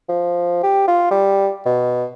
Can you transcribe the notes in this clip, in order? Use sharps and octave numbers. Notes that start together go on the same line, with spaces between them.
F3
G4
F4
G3
B2